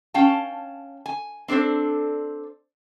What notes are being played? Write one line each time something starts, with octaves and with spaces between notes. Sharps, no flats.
C#4 F5 G5 A5
G#5
C4 D4 A4 C5 D5